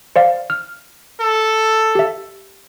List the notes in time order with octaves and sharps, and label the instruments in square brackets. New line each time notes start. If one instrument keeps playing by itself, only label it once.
[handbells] C5 D5 F5
F6
[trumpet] A4
[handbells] G4 E5